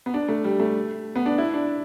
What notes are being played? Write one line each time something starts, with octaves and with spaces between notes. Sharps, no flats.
B3
D4
A3
G3
A3
B3
D4
E4
D4